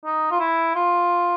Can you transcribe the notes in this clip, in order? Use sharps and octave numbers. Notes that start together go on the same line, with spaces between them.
D#4
F4
E4
F4